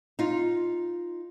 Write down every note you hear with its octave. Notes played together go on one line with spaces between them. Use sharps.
D#4 F4